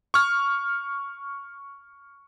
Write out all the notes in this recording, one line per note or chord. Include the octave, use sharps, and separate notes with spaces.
C#6 F6